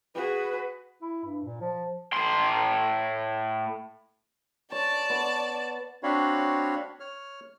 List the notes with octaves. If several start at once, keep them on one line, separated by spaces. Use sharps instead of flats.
F#4 G#4 B4
E4
G2
A#2
F3
A2 C6
C#5 D5 A5
B3 C#6
C4 D4 F#4 C#5 F5 B5
C#5 F6